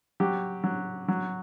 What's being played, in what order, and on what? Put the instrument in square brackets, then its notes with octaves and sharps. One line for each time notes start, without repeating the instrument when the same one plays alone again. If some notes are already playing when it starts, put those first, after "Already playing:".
[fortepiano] F#3 G4
F#3
F#3